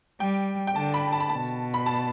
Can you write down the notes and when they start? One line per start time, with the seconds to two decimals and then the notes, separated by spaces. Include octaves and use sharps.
0.20 G3 G5
0.67 G5
0.76 D3 A5
0.94 B5
1.12 A5
1.20 B5
1.29 B2 A5
1.74 B5
1.86 A5